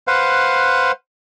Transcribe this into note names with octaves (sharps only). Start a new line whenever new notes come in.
B4 C5 F5 F#5